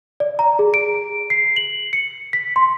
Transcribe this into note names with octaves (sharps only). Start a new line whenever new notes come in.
D5
A#5
G#4
D7
C7
F#7
C#7
B6
C6